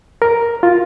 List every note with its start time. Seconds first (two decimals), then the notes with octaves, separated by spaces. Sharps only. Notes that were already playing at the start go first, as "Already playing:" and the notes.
0.22 A#4
0.63 F4